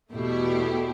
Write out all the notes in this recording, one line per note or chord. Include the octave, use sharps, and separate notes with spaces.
E2 B2 A3 E4 G4